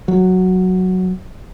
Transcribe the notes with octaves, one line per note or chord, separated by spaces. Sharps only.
F#3